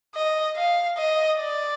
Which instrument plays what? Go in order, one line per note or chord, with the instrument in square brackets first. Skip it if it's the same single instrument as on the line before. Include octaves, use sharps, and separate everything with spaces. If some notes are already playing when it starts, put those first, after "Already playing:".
[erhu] D#5
F5
D#5
D5